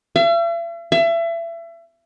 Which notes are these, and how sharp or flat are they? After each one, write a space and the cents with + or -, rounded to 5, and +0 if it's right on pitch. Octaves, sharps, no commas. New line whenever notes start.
E5 +45
E5 +30